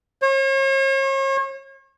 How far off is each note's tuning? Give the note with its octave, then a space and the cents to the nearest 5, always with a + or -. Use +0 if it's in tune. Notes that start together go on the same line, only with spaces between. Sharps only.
C#5 -45